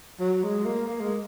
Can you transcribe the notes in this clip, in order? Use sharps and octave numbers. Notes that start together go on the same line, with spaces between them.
F#3
G#3
A#3
A#3
G#3